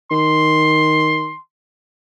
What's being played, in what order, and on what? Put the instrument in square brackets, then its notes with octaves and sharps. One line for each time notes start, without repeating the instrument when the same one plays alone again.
[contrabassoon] D#3 [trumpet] C6